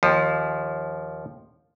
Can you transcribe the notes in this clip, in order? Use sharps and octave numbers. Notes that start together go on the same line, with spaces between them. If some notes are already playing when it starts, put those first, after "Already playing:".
D#2 F3